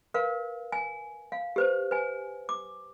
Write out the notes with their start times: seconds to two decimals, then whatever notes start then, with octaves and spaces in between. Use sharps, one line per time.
0.14 A#4 B4 F5
0.72 G#5
1.32 F5
1.56 G4 B4 C5
1.91 B4 G#5
2.49 D6